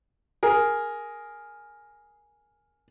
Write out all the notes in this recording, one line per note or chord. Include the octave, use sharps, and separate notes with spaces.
G#4 A#4